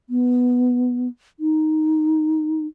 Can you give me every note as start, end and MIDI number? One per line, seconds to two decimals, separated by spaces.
0.10 1.08 59
1.40 2.66 63